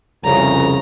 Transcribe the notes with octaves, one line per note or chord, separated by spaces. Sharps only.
C2 F2 C#3 A#5